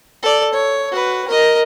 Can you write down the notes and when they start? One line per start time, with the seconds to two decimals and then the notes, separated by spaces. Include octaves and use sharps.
0.23 A4 D5
0.53 C#5
0.92 F#4 B4
1.28 A#4 D#5